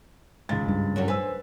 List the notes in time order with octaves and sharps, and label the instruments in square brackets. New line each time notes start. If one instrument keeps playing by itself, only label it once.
[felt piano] C#2 F5 A6 [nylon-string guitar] G#2
[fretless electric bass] G2
[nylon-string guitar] F#2 F#3 G3
[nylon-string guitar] B4 [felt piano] C5 G#5 E6